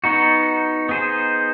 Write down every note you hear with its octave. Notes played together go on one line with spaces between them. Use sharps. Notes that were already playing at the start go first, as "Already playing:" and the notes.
B3 D#4 F#4
B3 D#4 G#4 C5